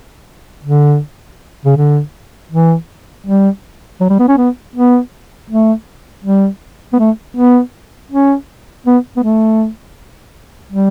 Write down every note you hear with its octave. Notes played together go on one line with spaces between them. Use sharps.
D3
C#3
D3
E3
G3
F#3
G3
B3
C#4
B3
B3
A3
G3
B3
A3
B3
C#4
B3
B3
A3
G3